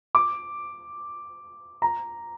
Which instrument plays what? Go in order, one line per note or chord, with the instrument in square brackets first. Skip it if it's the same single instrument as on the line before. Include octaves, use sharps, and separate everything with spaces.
[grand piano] D6
A#5